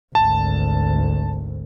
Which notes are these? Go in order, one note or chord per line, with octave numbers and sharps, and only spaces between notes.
G#1 D2 A5